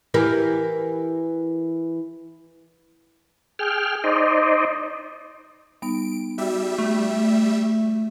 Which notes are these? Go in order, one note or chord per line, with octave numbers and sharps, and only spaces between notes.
E3 G4 A#4
G#4 G5 F6
D#4 C5 D5 D#5
G3 B3 D#4 D7
G3 F#4 E5
A3